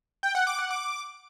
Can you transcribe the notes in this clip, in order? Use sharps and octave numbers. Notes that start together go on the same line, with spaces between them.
G5
F#5
D6
F#5
D6